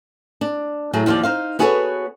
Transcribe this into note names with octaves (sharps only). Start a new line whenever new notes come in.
D4
A2 F#3 A3 G#4
D#2 F3 F4 G4 D5
D#4 C5 F5
B3 F#4 G#4 A4 B4 C#5